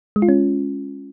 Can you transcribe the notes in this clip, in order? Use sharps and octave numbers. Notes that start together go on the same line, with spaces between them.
G#3
F4
C#4